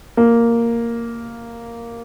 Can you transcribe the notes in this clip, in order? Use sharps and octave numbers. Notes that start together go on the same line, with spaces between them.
A#3